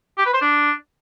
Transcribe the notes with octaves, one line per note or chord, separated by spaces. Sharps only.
G4
B4
C5
D4